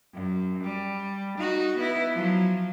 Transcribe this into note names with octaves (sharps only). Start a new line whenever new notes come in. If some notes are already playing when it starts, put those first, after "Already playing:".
F#2
G3
D#4 F#4
B3 E4
F3 F#3